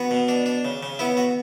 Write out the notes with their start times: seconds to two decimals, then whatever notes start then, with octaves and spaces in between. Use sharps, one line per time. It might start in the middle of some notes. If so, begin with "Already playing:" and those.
Already playing: B3 F#4
0.11 B2
0.28 D4
0.46 D4
0.65 C#3
0.83 C#3
0.99 B3 E4
1.17 F#4